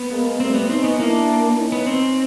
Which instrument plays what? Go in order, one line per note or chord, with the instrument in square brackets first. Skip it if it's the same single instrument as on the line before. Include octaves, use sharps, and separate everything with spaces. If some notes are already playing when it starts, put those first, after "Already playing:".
Already playing: [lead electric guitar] B3
[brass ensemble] G#3 A#3
[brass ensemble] G3 A3 [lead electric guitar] C4
[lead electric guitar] B3
[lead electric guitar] C4 [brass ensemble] C#4 D#4
[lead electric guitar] B3
[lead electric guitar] A#3 [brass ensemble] D4 E4
[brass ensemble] C#4 D#4
[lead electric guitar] B3
C4